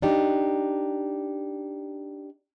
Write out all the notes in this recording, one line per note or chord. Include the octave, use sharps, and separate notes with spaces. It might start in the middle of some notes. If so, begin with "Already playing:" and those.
D4 D#4 G4